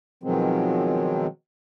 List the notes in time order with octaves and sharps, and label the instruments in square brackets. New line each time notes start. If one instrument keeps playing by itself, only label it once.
[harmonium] B2 D#3 F3 F#3 G#3 C4